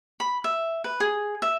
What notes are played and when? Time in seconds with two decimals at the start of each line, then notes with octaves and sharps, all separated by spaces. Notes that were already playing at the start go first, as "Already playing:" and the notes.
0.20 B5
0.44 E5
0.84 B4
1.00 G#4
1.42 E5